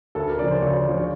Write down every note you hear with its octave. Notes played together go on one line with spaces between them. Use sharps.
D2 A4
A#4
C#3 F3 D5
C5
D2 C#5
C#5
C#3 F3 D5
C#5